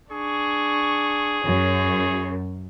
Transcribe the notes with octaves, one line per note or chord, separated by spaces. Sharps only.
D4 G#4 C#6
F#2 C#5